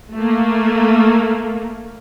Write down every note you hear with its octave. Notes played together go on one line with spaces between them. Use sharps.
A3 A#3